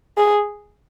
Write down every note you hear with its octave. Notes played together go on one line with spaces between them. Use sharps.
G#4